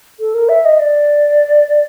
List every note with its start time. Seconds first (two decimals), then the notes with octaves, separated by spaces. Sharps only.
0.20 A4
0.34 A#4
0.49 E5
0.65 D#5
0.79 D5